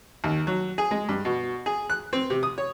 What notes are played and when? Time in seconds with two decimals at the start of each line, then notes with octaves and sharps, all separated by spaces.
0.24 D#2
0.47 F#3
0.78 G#4
0.91 G#3
1.09 G2
1.25 B2
1.66 G#4
1.90 F#6
2.13 C4
2.30 C3
2.43 D#6
2.58 C#5